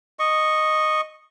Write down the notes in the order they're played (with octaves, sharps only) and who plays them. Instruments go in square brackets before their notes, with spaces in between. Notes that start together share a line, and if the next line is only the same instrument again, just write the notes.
[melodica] D#5 C#6